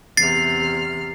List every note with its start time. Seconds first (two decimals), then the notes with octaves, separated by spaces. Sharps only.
0.17 E2 C3 F6 A6 C7